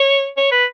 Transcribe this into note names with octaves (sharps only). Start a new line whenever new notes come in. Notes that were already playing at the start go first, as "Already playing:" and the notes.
Already playing: C#5
C#5
B4